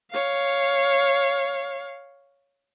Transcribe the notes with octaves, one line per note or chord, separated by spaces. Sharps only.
C#5 F5